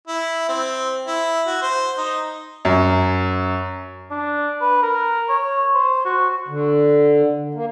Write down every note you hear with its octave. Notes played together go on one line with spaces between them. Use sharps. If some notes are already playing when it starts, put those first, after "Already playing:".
E4
C4
E4
F#4
C5
D#4
F#2
D4
B4
A#4
C#5
C5
F#4
D3
A#3